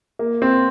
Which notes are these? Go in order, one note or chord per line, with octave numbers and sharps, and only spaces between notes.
A#3
C4